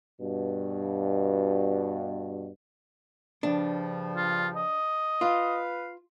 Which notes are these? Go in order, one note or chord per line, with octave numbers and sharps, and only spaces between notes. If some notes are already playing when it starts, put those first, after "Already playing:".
G2 B2
G2 C#3 F3 D4
F4
D#5
F4 B4 F5